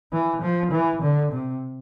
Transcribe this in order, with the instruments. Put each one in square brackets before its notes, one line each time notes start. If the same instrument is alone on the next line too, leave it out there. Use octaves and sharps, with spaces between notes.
[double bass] E3
F3
E3
D3
C3